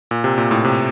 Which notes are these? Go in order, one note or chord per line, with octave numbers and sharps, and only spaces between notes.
A#2
C3
A#2
A2
C3